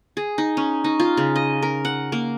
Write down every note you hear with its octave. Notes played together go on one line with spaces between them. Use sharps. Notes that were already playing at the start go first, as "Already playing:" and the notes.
G#4
D#4
C#4
D#4
F4
C#3
D#5
A#4
F#5
A#3